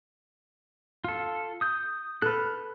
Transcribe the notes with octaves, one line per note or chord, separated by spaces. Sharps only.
F4 A4
D#6 G6
A4 B4 F6 F#6